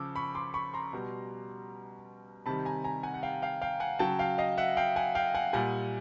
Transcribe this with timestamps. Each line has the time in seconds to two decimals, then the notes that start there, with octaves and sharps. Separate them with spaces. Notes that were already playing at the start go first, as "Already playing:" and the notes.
Already playing: C#3 F3 D6 E6
0.16 B5 C#6
0.35 C6 D6
0.54 B5 C#6
0.74 A#5 C6
0.93 B2 G3
2.46 C3 D#3 G3 A5 B5
2.65 G#5 A#5
2.84 G#5 A#5
3.03 F#5 G#5
3.14 F#5
3.23 F5 G5
3.42 F5 G5
3.62 F5 G5
3.80 F#5 G#5
3.99 C#3 F#3 G5 A5
4.19 F5 G5
4.38 D#5 F5
4.57 E5 F#5
4.77 F5 G5
4.96 F#5 G#5
5.15 F5 G5
5.35 F#5 G#5
5.53 A#2 G3 F#5 G#5